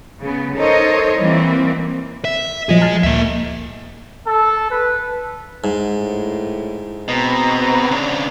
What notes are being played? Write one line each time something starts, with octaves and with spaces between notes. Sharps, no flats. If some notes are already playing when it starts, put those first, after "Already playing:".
C#3 B3
D#4 A4 A#4 C5 C#5 D#5
E3 G3 A#3 C4
E5
A#2 F3 F#3 G#4 D#5
A5 F6 A6
D2 A#2 A#3 E5
A4
B4
G#2
A2
B2 C4 B4 A#5
C#3 D4